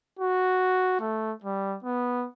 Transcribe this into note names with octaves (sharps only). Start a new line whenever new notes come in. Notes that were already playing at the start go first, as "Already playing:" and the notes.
F#4
A3
G3
B3